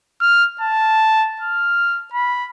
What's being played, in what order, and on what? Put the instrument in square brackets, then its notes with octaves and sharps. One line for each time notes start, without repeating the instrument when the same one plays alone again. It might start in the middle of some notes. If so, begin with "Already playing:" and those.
[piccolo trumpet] F6
A5
F6
B5